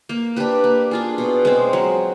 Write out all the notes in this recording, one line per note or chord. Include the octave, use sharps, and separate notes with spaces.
A#3
D4 G4 B4
A#3
D4 F4 G#4
B2
G#3 C4
F#3